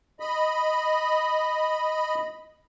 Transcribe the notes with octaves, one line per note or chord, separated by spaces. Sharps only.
D#5 B5